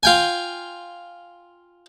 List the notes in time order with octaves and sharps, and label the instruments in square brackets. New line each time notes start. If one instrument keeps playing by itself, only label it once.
[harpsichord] F4 G5 G#5